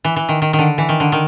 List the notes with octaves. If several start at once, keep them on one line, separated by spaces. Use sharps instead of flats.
E3
E3
D#3
D#3
D#3
D3
E3
D#3
D3
D#3